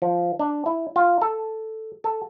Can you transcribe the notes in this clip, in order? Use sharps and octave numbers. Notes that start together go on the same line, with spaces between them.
F3
D4
E4
F4
A4
A4